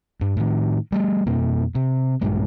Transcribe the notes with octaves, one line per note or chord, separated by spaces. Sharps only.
G2
A2 D#3
G3 A3
F2 B2 A#3
C3
A#1 G2 G#3